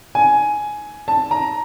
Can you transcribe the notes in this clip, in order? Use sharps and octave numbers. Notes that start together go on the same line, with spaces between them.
G#5
A5
A#5